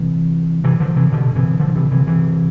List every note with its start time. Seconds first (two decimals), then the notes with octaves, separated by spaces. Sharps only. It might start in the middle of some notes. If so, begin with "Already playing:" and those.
Already playing: C3 E3
0.64 C3 E3
0.80 D3 F3
0.96 C3 E3
1.12 B2 D3
1.36 C3 E3
1.60 D3 F3
1.76 C3 E3
1.91 C3 E3
2.07 C3 E3